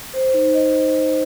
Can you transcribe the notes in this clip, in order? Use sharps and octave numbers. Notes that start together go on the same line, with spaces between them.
C5
D#4
D#5